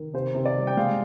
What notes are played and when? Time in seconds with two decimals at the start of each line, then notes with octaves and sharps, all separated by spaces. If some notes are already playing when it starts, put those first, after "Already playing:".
Already playing: D#3
0.14 C3 C5
0.35 C3
0.45 D5
0.56 G3
0.67 G5
0.77 G#3 F5